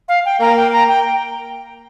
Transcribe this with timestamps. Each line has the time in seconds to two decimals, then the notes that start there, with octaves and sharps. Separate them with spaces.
0.08 F5
0.25 G5
0.40 A#3 A#5
0.56 G5
0.73 A#5
0.88 G5